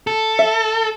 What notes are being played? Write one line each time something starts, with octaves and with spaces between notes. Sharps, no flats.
A4
E5